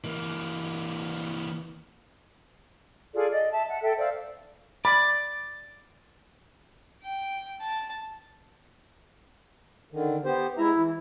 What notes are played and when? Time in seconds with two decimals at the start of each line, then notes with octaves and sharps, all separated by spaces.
0.04 E3 A#3
3.14 F4 G#4 A4 D5
3.31 D5 D#5
3.50 E5 A5
3.68 F#5
3.82 A4 E5 G5
3.98 C5 D5 F5 E6
4.85 D5 B5
7.03 G5
7.61 A5
9.92 D3 D#3
10.25 B3 G4 C5
10.58 G#3 E4 E5 A#5
10.76 E3